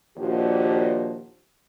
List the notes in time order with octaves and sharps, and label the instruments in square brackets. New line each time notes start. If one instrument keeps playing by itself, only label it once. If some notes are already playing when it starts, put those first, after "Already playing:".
[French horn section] D#2 A#2 F3 D4 F#4 G4